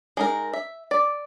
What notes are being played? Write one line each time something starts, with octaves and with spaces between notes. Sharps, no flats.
G#3 D#4 A#4
E5
D5